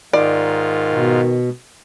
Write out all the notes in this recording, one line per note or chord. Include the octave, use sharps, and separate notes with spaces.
G#2 D#3 F4 D5
B2